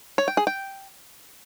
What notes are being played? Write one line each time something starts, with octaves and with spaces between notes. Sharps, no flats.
C#5
G5
G#4
G5